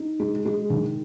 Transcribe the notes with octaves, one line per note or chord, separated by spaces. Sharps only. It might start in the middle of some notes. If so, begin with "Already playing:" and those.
Already playing: D#4
G#3
G#3
D#3